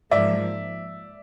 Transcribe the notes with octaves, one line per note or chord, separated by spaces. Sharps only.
G#2 F3 A#3 D5 E5